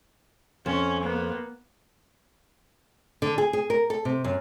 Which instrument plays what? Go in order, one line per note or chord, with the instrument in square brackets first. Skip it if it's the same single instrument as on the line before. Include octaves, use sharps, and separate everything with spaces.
[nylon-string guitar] F2 [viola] C#4
[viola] A#3 B3
[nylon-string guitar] D3
G#4
G#4
A#4
A4
C3
F#2